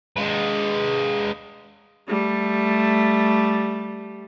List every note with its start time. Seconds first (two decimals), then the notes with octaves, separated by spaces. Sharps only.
0.17 G#3 B4
2.08 G3 A3